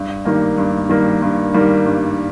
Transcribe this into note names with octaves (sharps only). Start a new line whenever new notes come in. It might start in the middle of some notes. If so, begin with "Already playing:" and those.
Already playing: G2
D#3 G3 A#3
G2
D#3 G3 A#3
G2
D#3 G3 A#3
G2